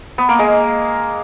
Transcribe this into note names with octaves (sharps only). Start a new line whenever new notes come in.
B3
A#3
G#3